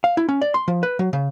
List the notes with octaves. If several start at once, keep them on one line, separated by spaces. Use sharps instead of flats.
F5
E4
C#4
D5
C6
F3
B4
F#3
C#3